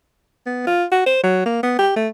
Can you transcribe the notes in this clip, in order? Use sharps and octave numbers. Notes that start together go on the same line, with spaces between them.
B3
F4
F#4
C5
F#3
A#3
B3
G4
A3